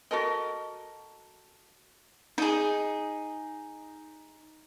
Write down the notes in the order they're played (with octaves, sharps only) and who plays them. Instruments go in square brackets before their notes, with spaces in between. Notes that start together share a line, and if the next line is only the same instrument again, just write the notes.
[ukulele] F#4 A4 A#4 D#5
[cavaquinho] D#4 G#4